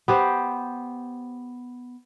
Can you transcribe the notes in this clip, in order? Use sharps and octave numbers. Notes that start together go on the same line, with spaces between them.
B3 G4 C5